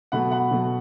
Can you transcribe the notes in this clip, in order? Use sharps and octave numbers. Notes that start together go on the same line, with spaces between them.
B2 F#3 A3 F#5 B5
F#5 B5
B2 F#3 A3